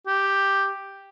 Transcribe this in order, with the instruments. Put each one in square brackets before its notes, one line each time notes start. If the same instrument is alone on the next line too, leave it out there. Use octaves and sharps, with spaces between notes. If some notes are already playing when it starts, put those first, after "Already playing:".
[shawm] G4